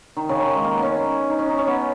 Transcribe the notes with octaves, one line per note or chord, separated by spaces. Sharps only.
D#3
C#3
D#3
G#3
A#3
B3
C#4
D#4
C#4
D#4
C#4
B3